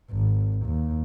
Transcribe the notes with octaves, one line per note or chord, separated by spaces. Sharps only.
G#1
D#2